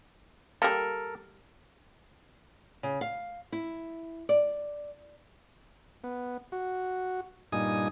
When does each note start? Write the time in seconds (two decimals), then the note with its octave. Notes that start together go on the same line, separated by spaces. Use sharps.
0.62 G3 A#3 A4 A#4
2.83 C#3
3.01 F5
3.52 E4
4.29 D5
6.04 B3
6.52 F#4
7.52 G2 A#2 D#4 G#5 D#6